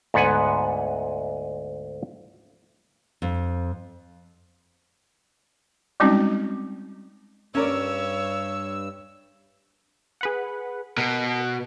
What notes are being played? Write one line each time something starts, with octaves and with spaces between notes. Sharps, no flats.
D2 G#2 B3 F#5 G#5
F2
G3 G#3 C4 C#4 D#4 F#4
G2 C#4 A#4 C#5 D5 E6
G#4 B4 F#5
B2 A#4